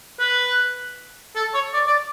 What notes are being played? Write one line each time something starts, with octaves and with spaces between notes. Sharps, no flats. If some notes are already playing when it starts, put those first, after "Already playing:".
B4
A4
C#5
D5
D5